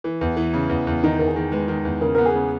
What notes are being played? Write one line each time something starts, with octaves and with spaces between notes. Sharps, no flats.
E3
E2
E3
C#3
E2
E2
D#3 D#4
E2 A#4
G#4
D#3
G#3 B4
D#3
E2
C#3 A#4
B3 A#4
G#4
C#3